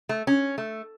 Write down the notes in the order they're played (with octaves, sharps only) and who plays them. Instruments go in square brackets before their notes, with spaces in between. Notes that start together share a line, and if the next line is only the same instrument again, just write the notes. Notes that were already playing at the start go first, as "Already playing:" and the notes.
[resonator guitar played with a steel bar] A3
C#4
A3